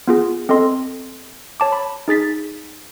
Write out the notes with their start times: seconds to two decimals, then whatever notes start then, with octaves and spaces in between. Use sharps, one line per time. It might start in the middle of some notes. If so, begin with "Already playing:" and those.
0.07 B3 F4 G#4
0.49 C4 A4 D#5 C6
1.60 C#5 A5 D6
1.72 B5
2.08 D#4 G#4 A6 B6